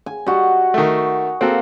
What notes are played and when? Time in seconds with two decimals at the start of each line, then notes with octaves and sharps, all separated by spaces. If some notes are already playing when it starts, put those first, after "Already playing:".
0.06 G#5
0.26 G3 F#4 D#5
0.74 D#3 A3
1.41 A#3 C4 F#4 A4